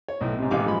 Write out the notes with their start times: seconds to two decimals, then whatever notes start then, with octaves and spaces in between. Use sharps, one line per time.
0.08 C#5
0.21 B1 A2
0.39 G#2 C3
0.51 A1 B2 G#3 G4 F5 D6
0.65 F#2 F3 G#3 F4 B5